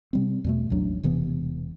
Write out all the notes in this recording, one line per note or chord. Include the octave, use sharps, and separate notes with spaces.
C3 G3 C4
E2 B2 A3
A1 D#2 F#3 D4
E1 C3 E3 B3